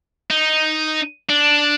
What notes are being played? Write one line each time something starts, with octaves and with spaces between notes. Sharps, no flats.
D#4
D4